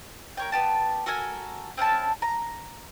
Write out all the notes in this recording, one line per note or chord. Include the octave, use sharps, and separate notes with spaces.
A#4 C#5 G5
B3 G4 A5
F#4 A4 A#4 G#5
C4 C#4 E4 A5
A#5